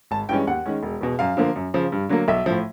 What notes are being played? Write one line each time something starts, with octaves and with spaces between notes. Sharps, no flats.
G#1 A5
G2 E3 G#3 C#4 G5
D#2 F#5
D#3 G#3 C#4
E1
E2 B2
F#2 F5
D3 F3 A#3
F#2
C#3 F3
G2
D3 F#3 A#3
B1 E5
A2 F3